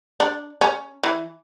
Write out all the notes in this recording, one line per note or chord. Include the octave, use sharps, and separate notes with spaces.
D4
C#4
E3